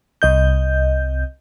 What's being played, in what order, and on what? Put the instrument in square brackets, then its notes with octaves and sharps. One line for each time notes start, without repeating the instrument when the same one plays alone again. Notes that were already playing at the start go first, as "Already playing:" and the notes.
[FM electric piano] C2 D#5 G6